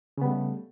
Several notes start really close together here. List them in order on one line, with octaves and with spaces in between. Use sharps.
C#3 B3 G3 A3